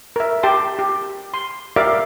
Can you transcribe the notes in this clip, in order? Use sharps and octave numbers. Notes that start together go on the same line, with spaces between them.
A#4 E5
G4 G5 A5 C6
G4
C6
G4 A#4 D5 E5 F5 D6